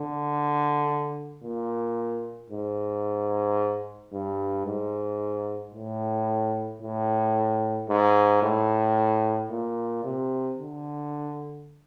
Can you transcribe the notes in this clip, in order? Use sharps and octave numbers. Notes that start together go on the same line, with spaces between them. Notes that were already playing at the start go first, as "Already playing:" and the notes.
Already playing: D3
A#2
G#2
G2
G#2
A2
A2
G#2
A2
A#2
C3
D3